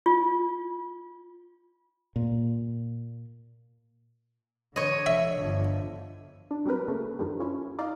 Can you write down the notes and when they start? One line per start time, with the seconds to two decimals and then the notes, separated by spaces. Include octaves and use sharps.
0.06 F4
2.16 A#2
4.76 D3 C#5 D#5
5.06 E5
5.40 G1 D3 F3
6.51 D4
6.65 F#3 G3 C4 A#4 B4
6.88 C#3 A3 A#3
7.19 F#2 D3 D#3 F3 G3
7.40 F3 C#4 E4
7.79 D#4 D5 D#5 F5